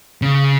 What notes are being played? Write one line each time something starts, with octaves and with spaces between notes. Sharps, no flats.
C#3